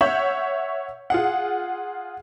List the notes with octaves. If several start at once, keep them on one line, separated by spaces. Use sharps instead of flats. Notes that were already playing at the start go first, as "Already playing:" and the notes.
C#5 E5 F#5 C#6 G6 F#7
F4 G#4 F#5